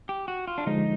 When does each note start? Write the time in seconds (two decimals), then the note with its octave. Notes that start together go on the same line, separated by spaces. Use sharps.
0.09 G4
0.28 F#4
0.47 F4
0.58 D4
0.67 D3 F3 G#3 D#4